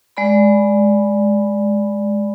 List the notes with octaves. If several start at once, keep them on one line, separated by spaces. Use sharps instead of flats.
G#3 D5 B5